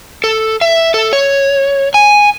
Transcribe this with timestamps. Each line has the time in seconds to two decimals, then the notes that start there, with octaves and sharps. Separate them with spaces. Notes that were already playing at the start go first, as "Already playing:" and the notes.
0.24 A4
0.61 E5
0.94 A4
1.13 C#5
1.94 G#5